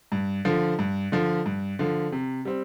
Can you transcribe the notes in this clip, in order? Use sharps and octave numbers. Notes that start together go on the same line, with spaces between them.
G2
D3 F3
G2
D3 F3
G2
D3 F3
C3
G3 C4